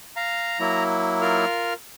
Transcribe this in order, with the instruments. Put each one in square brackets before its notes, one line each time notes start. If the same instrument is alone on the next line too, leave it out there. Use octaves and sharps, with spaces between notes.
[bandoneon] F5 [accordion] A#5
[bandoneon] F#3 A#3 E4
[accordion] F4 A#4 F6